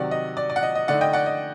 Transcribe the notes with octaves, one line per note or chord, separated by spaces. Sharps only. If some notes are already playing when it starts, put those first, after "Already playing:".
Already playing: C3 D#3 F#3 D5 F#5
D#5
D5
D5
F#5
D#5
D#5
D3 A3 D#4 D5 F#5
D#5 G5
D5 F#5
D#5